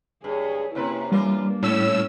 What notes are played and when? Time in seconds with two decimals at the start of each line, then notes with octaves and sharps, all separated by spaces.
0.24 G2 G#4 C#5
0.75 F#2 C3 A#3 E4 B4
1.12 E3 G3 A#3 D4 F4 A#4
1.63 A2 C#4 E6